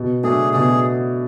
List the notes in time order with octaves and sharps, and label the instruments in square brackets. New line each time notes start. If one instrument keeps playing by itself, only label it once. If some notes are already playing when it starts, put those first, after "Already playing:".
Already playing: [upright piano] B2
[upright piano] F#3 A3 D4 [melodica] G#4
[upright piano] B2 [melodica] G#4